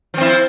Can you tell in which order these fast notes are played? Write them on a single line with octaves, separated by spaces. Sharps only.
F3 C4 E4